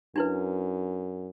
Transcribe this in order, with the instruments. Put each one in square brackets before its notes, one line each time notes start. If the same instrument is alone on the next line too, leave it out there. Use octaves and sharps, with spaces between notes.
[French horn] F#2 [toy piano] D4 E4 B4